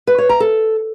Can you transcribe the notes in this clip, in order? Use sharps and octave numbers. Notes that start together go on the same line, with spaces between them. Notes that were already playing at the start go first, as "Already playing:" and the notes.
B4
C#5
A#5
A4